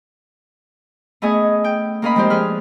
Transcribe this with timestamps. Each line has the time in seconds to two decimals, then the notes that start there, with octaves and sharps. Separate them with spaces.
1.22 A3 B3 C#4 G#4 D#5 G#5
1.64 G5
2.02 A#3 C#4 A#4 D#5 F5 B5
2.15 F3 G#3 C4 D4 G4 C5
2.30 F3 G#4 B4 F6